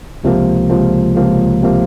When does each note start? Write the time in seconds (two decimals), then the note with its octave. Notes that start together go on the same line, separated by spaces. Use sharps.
0.24 C#2 C3 F3 A#3
0.69 C#2 C3 F3 A#3
1.16 C#2 C3 F3 A#3
1.63 C3 F3 A#3